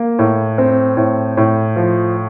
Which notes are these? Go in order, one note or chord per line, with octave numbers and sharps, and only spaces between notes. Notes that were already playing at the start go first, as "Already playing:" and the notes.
Already playing: A#3
A2
C4
A2
A2
F3